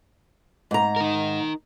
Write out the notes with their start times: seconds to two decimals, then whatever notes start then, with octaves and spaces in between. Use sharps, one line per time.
0.71 G#2 A#5
0.96 D#4 A#4